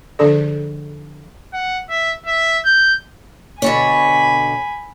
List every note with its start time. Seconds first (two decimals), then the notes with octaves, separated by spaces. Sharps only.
0.19 D3 F3 D4 G#4 A4 D5
1.53 F#5
1.89 E5
2.26 E5
2.65 G6
3.62 B2 D3 C#5 G#5 B5